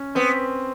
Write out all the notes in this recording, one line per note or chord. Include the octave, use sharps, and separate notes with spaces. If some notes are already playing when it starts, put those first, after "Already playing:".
Already playing: C#4
B3 C4